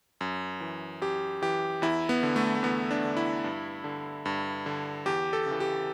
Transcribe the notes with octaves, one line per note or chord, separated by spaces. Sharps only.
F#2
E3
F#2 G4
E3 G4
E2 E4
B3
D3
A3
A3
E2 B3
D4
D3
E4
G2
D3
G2
D3
E2 G4
A4
C#3
E3
G4